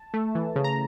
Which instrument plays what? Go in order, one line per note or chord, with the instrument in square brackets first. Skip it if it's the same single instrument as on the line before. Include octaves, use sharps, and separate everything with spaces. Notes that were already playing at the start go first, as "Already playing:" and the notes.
Already playing: [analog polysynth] A5
A3
E3
C#3
A#5